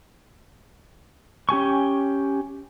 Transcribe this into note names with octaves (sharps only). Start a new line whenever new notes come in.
C#4 G4 G#5 C#6